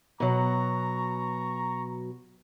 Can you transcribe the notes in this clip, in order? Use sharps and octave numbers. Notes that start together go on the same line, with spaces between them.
B2 F#3 A#5 C#6